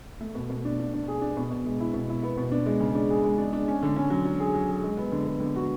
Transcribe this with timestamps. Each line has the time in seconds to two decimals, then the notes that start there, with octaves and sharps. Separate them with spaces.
0.21 A3
0.35 B2
0.50 B2
0.65 D4
0.79 D4
0.94 D4
1.08 G#4
1.22 D4
1.37 B2
1.51 B2
1.66 G#3
1.80 E4
1.94 B2
2.09 E4
2.23 B3
2.38 B2
2.52 D4
2.66 G#3
2.80 C#3
2.95 D4
3.10 G#4
3.24 G#3
3.38 D4
3.53 D4
3.68 C#4
3.83 D3
3.96 C#4
4.10 F#3
4.25 F#3
4.40 G#4
4.55 F#3
4.69 G#4
4.84 G#3
4.98 B3
5.12 D3
5.26 B3
5.40 D3
5.56 F#4